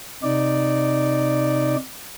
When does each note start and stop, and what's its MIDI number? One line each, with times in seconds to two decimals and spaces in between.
0.23 1.76 48
0.23 1.76 63
0.23 1.76 74